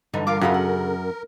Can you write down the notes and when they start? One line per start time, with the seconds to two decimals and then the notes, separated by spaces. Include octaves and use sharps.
0.14 G2 D3 E3 D#4
0.27 F4 A#4 F5 D6
0.42 F#2 C#3 F4 F#4 A4 E5 D#6
0.54 F#5